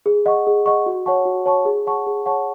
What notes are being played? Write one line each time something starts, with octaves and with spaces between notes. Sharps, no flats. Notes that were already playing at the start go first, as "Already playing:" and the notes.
G#4
D#5 F#5 C#6
G#4
D#5 F#5 C#6
F#4
C#5 F#5 A5 C#6
F#4
C#5 F#5 A5 C#6
G#4
C#5 F#5 A5 C#6
G#4
C#5 F#5 A5 C#6